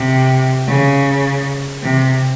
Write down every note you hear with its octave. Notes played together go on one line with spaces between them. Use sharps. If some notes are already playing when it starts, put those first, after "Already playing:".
Already playing: C3
C#3
C3